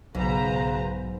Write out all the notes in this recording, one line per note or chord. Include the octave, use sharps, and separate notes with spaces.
B1 G#2 C#3 B4 C5 A#5